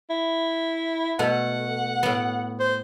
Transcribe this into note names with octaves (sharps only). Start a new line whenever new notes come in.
E4
B2 A3 F#5
A2 B3
C5